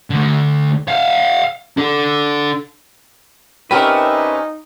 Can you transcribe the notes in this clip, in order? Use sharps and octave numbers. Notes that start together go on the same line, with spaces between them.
D3 A3
F5 F#5
D4 A4
A#2 C4 C#4 D#4 G4 A#4 B4 E5